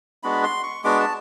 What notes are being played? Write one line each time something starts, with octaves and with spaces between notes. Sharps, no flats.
G#3 B3 D4 F#4 B5
C6
C#6
G#3 B3 D4 F#4 D6
A5